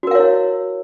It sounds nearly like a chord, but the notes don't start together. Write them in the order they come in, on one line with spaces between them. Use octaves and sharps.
F#4 A#4 F5 C#5 E4